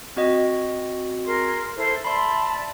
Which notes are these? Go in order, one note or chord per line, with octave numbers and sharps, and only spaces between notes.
C4 F#4 D#5
G#4 A#4 C6
E4 A4 C5
D5 E5 A5 B5 C6